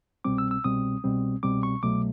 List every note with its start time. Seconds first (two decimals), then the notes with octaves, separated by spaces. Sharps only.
0.24 C2 B2 G3 C4 D6
0.38 E6
0.51 E6
0.64 C2 B2 G3 C4 D#6
1.04 C2 B2 G3 C4
1.43 C2 B2 G3 C4 D6
1.63 C#6
1.83 C2 B2 F#3 A3 D6